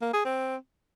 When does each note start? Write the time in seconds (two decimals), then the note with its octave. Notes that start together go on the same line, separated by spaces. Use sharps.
0.02 A#3
0.13 G#4
0.25 C4